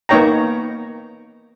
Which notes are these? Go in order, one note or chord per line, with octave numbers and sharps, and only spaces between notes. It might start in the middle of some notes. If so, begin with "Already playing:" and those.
A#3 B3 D#4 C#5 G5 A#5